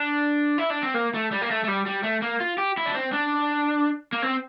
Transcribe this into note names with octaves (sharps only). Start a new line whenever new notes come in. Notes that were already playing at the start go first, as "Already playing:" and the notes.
Already playing: D4
E4
D4
C4
A#3
A3
G3
A#3
A3
A3
G3
G3
A3
A#3
F4
G4
E4
D4
C4
D4
A#3
C4